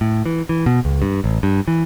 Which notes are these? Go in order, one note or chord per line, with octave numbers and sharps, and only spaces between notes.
A2
E3
E3
B2
C#2
G2
A1
G2
E3